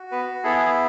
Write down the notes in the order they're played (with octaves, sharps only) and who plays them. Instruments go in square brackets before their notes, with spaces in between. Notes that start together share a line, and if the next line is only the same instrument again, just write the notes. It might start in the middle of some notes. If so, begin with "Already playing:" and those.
Already playing: [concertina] F#4
B3 B4
B3 E4 G#4 A4